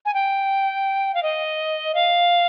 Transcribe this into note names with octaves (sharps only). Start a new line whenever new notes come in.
G#5
G5
F5
D#5
F5